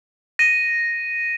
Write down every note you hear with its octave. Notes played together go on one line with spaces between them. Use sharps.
A#6 D#7